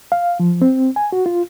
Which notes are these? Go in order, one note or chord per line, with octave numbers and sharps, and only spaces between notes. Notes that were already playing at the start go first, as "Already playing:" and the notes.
F5
F3
C4
G#5
F#4
F4